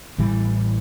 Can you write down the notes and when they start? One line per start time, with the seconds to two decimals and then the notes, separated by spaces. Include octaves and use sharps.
0.18 A1 A2 E3 G3